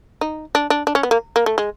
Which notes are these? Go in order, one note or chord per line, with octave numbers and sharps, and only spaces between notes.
D#4
D4
D4
D4
C#4
B3
A#3
A#3
A3
G#3